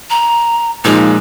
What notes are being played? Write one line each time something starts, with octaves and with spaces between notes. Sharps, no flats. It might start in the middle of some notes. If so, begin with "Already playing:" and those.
A#5
A#2 F3 G#3 D#4